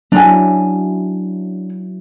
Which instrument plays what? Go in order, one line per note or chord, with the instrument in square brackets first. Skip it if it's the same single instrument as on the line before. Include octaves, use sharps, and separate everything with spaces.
[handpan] F#3 E4 [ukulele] D4 G#5